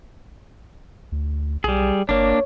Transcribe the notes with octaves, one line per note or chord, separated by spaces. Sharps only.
D2
B1 G3 G#4
G1 A#3 D4 C#5